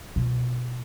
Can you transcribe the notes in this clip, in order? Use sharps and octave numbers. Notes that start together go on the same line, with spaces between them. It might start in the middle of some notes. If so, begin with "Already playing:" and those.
B2 F4